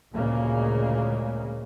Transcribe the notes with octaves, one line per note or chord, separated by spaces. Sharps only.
D2 A#2 C#3 G#3 A#3